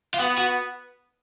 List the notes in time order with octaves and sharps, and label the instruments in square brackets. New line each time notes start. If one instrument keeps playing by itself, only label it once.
[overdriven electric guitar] F4
[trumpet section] B3 [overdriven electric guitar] F#4
[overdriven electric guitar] F#4